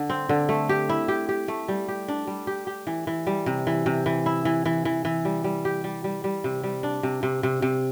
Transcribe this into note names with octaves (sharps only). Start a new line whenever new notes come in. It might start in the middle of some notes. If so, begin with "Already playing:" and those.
Already playing: D3
C4
D3
A3
G4
E4
G4
G4
A3
G3
G4
D4
G3
G4
G4
E3
E3
G3
C3
E3
C3
E3
E4
E3
E3
E3
E3
G3
G3
G4
G3
G3
G3
C3
G3
D4
C3
C3
C3
C3